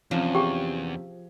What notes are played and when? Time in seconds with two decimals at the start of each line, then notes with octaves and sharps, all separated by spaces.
0.11 E2 C3 F3 C#4
0.35 G4 G#4 G5